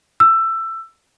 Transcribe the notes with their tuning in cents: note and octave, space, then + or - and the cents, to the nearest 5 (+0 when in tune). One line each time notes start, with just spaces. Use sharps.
E6 +20